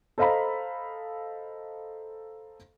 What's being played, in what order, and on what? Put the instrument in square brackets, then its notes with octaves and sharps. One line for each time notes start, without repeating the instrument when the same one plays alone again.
[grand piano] A4 C5 D#5 F5 A#5 B5